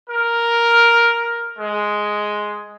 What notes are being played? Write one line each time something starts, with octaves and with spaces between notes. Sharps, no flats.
A#4
G#3